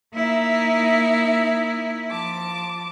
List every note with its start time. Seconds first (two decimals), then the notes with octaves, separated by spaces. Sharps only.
0.15 A#3 D#4 E4 E5
2.10 F3 A5 D6